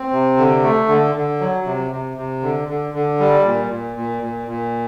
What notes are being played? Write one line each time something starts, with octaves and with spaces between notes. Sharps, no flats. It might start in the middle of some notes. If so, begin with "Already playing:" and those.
Already playing: C4
C3
D3
A3
D3
D3
F#3
C3
C3
C3
D3
D3
D3
G3
A#2
A#2
A#2
A#2
A#2